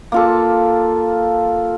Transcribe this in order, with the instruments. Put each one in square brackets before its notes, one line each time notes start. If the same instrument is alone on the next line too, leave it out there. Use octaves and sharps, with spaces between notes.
[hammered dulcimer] A#3 F4 A4